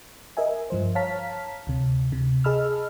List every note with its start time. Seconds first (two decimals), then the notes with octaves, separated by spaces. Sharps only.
0.37 A#4 D#5 E5 G#5
0.70 G2 F3 C5
0.95 C#5 F5 A5 A#5 F6 B6
1.67 D2 C3
2.12 C3
2.44 G#4 D#5 A5 B5 E6 F6